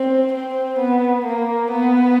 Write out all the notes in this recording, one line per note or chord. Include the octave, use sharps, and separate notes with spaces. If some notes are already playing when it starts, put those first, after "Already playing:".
Already playing: C4
C4
B3
A#3
B3